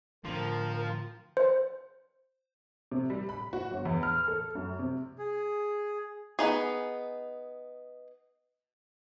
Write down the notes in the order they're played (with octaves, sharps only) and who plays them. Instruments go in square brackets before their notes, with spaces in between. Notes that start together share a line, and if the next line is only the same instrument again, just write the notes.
[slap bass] A2 D3 [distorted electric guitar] F3 [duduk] A#4
[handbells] C5
[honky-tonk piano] C3
G3
B5
F#4
G1
E2
F6
A4
F#2
C3
[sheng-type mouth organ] G#4
[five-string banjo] B3 D#4 G#4